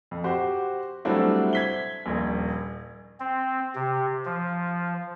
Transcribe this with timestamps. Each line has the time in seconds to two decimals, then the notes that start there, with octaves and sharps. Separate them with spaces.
0.11 F2
0.24 F#4 G4 C5
1.05 F#3 G3 A3 C4 D4 E4
1.53 G#6 B6 G7
2.06 D#1 A#1
3.20 C4
3.75 C3
4.25 F3